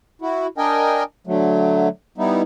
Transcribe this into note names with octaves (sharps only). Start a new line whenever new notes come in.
E4 F#4
D4 A#4 D#5 G5 G#5
D3 F#3 A3
G3 B3 D#4 E4